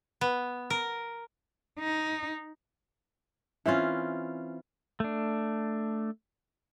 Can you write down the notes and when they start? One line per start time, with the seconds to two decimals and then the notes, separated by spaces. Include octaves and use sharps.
0.21 B3
0.70 A#4
1.79 D#4
3.66 E3 C4 C#4 F4
5.00 A3 D4